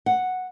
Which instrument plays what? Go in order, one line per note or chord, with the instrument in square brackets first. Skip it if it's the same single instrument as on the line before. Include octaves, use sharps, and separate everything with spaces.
[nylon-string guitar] F#5